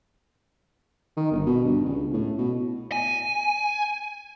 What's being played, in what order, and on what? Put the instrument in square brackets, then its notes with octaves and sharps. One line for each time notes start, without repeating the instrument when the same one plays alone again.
[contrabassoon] D#3
G1
B2
G2
C#2
A2
B2
[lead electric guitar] G#5